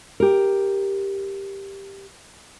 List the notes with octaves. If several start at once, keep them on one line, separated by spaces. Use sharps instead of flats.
G4 A#4